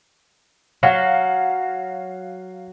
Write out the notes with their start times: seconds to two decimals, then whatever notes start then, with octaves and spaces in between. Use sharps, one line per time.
0.83 F#3 F5